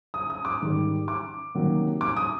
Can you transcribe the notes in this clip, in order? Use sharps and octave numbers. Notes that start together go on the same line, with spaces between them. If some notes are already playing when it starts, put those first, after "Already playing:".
D#6
D#6
D6
G#2 D#3 G3
D6
C3 D#3 F#3 A#3
D6
D#6